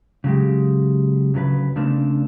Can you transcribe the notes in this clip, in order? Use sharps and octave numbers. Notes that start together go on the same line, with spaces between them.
C#3 F#3 G#3 G4
D2 C#3 F#3 A4 B4
C#3 A3 A#3 C4 D4